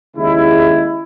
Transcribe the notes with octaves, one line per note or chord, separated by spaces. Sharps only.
D#2 C#3 G#3 E4